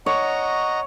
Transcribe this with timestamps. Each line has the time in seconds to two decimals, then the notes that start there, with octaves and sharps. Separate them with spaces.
0.06 C#5 D#5 F#5 A#5